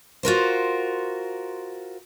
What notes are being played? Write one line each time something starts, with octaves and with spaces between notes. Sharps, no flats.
F4 F#4 A#4 C5